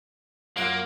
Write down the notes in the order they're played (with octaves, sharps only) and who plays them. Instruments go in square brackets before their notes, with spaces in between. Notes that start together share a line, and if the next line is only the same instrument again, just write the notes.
[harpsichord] F#2 F4 F#5 [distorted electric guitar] A#3